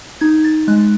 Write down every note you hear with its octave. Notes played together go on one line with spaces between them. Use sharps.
D#4 G#6
A6
G#3 F#6